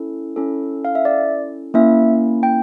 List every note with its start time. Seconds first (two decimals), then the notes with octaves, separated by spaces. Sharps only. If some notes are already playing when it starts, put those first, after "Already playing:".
Already playing: C#4 E4 A4
0.36 C#4 E4 A4
0.85 F5
0.95 E5
1.05 D5
1.74 A#3 C#4 E4 E5
2.43 G5